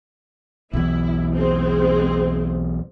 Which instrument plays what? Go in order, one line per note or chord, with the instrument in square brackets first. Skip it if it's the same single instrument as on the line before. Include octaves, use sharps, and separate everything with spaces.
[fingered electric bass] B1 E2 [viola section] E4
[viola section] G#3 C4